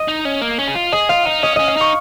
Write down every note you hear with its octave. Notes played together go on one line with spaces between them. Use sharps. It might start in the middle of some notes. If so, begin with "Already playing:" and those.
Already playing: D#5
D#4
C#4
A#3
C#4
G#4
F4
G#4 D#5
F4 F5
D#4 F5
C#4 D#5
C#4 D#5
F5
D#4 C#6